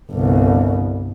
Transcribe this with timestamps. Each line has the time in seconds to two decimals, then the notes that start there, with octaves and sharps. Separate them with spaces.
0.12 G1 C2